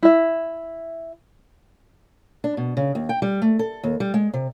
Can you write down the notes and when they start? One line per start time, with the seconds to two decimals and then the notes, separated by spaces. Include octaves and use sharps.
0.03 E4 E5
2.44 D4
2.57 B2
2.77 C#3
2.95 D#2
3.09 G5
3.22 G3
3.42 A3
3.59 A4
3.83 D#2
4.00 G3
4.14 G#3
4.33 C3